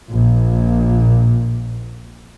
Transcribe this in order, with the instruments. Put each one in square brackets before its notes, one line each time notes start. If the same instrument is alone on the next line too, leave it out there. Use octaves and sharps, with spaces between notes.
[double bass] A#1 A#2